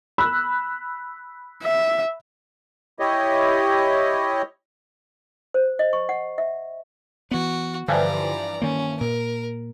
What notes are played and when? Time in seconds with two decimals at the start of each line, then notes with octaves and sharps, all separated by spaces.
0.18 B5 E6 F#6
1.63 E5
3.00 E4 G4 C#5 D#5
5.54 C5
5.79 D#5
5.93 C#6
6.09 F#5
6.38 E5
7.31 E3 B3 F#4
7.88 G2 D3 E3 F3 D5 A#5
8.62 D#3 A#3 C#4
9.01 A#2 A#4